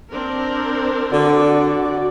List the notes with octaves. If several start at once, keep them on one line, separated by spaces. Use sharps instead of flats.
C4 D4 A#4
D3 F#4 D5